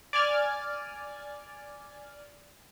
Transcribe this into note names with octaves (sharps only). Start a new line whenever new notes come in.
D5 G#5 D6 F6 G#6 A6